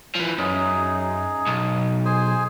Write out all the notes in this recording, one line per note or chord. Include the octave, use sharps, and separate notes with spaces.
E3 F3
F#2 D#4 G#4
B1
G#4 C5 G#5